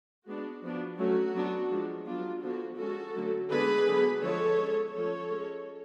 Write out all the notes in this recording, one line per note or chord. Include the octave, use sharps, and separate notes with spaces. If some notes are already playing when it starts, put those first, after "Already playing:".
G#3 B3 D4 F#4
F3 B3 D4
F#3 A3 C#4 F#4
F#3 B3 D4
F3 G#3 D4
F#3 B3 D4 F4
D3 F3 B3 D4 F#4
G#3 C#4 F#4 A4
D3 F#3 A3 C#4
D3 G#3 B3 D4 G#4 B4
D3 F#3 B3
D3 F3 G#3 A4 C#5
G#3 C#4
F3 A3 C#4 A4 C#5
G#3 C#4